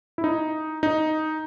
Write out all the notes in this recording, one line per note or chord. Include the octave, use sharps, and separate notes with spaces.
E4
D#4
D#4